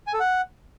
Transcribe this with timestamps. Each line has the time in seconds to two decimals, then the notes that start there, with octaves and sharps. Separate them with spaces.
0.07 G#5
0.13 A4
0.20 F#5